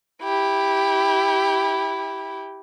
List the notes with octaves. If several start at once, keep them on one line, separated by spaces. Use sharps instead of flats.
E4 G4